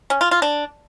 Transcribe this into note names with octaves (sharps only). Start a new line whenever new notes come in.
C#4
F4
F4
D4